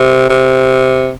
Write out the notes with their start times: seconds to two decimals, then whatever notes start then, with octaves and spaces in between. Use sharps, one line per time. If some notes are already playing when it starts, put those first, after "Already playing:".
Already playing: C3
0.29 C3